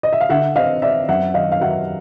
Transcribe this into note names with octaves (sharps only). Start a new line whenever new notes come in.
D#5
E5
F5
D3 E5 F#5
C4 D#5 F5
C4 D5 E5
F#2 E5 F#5
D#3 D#5 F5
F5
F#3 E5 F#5